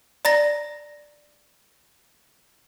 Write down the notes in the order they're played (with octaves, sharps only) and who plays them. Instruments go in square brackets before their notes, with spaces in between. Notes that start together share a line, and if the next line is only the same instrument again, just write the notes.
[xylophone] D5 A#5 A6 A#6